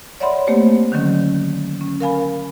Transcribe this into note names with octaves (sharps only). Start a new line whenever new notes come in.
C#5 D5 E5 F#5 B5 C6
A3 A#3 C4 G4 C5
D3 D#3 F#3 C#4
C#4
A#4 F5 G#5 B5